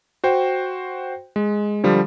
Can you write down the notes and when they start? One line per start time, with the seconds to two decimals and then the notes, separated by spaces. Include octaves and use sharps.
0.24 F#4 C5 G5
1.36 G#3
1.83 D3 F3 G3